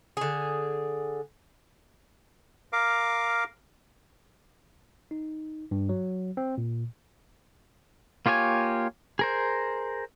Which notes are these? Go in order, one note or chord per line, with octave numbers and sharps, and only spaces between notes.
D3 G#4
A#4 F5 D6
D#4
G2
F#3
C4
A#2
A#3 F4 G4 C#5 G#5
G#4 A#4 C5